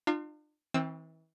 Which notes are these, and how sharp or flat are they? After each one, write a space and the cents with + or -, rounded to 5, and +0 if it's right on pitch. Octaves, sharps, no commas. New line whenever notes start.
D4 +45 F4 +0
E3 -35 C4 +20 E6 -10